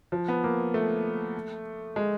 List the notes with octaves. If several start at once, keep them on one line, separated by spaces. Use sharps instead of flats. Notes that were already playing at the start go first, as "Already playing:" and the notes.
F3
B3
A#3
A3
G#3